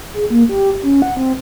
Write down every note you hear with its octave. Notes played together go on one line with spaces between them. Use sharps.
G#4
A#3
G4
C#4
F#5
C4